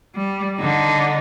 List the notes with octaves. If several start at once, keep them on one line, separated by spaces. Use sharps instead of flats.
G3
D3 D#4